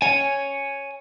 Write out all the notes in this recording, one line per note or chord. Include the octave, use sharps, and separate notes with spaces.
C#5 G#5